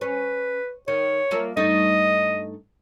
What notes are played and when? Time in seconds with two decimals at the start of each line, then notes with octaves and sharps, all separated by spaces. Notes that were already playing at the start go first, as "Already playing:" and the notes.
0.01 C#4 B4
0.88 D#3 C#5
1.31 F3 A#3 E5
1.57 G2 A3 D#4 D#5